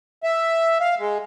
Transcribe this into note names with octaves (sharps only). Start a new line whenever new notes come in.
E5
F5
G#3